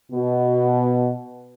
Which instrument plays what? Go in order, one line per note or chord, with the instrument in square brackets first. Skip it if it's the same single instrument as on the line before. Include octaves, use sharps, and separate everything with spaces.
[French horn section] B2